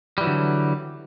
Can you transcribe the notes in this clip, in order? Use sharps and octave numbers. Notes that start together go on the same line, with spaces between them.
D3 E3 F#3 G3